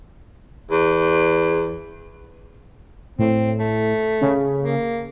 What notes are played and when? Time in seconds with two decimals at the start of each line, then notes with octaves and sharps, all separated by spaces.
0.71 E2
3.19 A2 C4
3.59 A3
4.21 C#3
4.62 A#3